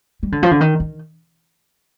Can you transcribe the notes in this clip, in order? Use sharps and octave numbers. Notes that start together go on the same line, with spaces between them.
G3
D3
F3
D3
D#3
D#3